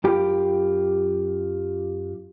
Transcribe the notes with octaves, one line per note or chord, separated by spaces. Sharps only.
F#2 F4 G4 G5 B5